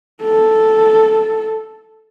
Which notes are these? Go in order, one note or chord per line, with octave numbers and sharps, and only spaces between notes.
A4